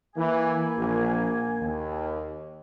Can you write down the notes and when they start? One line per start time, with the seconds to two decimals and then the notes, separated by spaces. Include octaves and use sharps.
0.15 E3 A#3 G#5
0.76 A#1
1.59 D#2